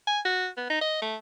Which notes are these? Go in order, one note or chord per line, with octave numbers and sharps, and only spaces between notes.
G#5
F#4
B3
D#4
D#5
A3